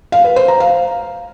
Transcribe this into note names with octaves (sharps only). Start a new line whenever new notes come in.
F5
B4
C5
A#5
F5